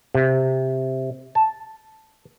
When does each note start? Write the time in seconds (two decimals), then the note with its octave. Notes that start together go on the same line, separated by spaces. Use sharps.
0.15 C3
1.35 A5